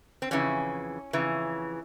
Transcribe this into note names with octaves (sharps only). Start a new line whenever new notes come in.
C4
F2 C#3 E3 C#4
F2 C#3 E3